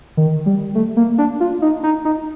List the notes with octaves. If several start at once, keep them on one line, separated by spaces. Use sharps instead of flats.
D#3
G3
A3
A#3
D4
F4
D#4
D#4
D#4